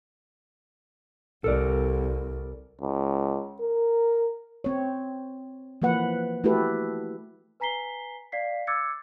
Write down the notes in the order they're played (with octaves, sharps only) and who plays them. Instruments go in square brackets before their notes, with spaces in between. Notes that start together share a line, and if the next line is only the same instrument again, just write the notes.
[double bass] C2 [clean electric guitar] A4 A#4 D5
[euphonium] C#2
A#4
[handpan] C4 C#5
E3 F3 A#3 B4 F#5
A3 E4 F#4 G4 A4 B4
[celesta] B4 G#5 A#5 B6 C7 G7
D5 F5 B6 C7
D6 E6 F#6 G#6 A6 C#7